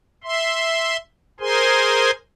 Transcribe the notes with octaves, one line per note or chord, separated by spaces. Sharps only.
E5 C6
G#4 A#4 C5 G#5 C6